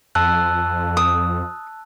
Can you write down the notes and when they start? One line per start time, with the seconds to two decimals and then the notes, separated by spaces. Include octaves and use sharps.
0.15 F2 A5 E6 F#6
0.97 D#6